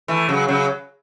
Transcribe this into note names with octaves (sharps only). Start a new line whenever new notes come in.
E3 A3
C#3 F#3
C#3 F#3